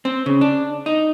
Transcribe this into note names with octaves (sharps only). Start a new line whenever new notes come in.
C4
C#3
D4
D#4